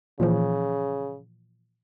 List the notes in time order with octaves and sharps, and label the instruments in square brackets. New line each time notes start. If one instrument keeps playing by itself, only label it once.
[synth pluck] A#2 E3 F3 [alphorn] C#3